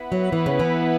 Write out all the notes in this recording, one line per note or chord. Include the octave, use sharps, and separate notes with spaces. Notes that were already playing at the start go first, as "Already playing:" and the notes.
Already playing: B3 E4 B4 F#5
F#3
E3
C#3
E3